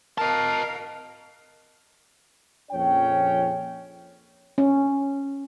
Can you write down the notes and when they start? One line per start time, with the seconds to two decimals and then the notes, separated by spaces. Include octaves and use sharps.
0.18 A#4 D#5 F5 A5
2.71 A#1 F2 C#4 C#5 G5
4.58 C#4